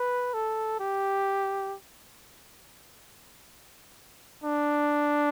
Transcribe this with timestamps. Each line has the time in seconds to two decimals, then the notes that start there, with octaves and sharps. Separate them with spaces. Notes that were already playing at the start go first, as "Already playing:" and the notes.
Already playing: B4
0.34 A4
0.80 G4
4.44 D4